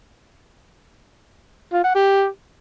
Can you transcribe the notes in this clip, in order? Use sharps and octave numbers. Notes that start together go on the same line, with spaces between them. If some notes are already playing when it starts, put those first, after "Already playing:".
F4
F#5
G4